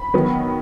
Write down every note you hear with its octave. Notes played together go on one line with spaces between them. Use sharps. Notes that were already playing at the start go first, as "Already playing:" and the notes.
Already playing: B5
D#3 F#3 B3